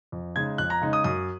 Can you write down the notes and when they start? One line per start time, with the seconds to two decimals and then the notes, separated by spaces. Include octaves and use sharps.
0.12 F2
0.36 C#3 G#3 D#4 G#6
0.58 F2 F#6
0.70 A#5
0.82 C#3 G#3 D#4
0.93 D#6
1.04 F#2 D#6